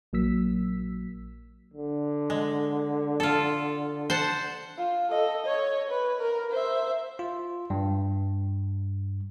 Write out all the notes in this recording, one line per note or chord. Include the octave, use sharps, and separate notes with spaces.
A#1 F#3 A#3 E6 B6
D3
G#3
F4 A4
C5 F#5 A5
F4
A4 D#5
C#5 D#5
B4
A#4
C5 E5
F4
G2